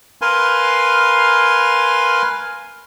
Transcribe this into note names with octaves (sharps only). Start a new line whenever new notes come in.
A#4 B4 F5 G#5 C6